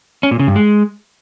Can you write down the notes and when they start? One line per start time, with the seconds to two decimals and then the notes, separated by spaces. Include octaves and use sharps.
0.23 C#4
0.31 A#2
0.39 C#3
0.48 G2
0.56 G#3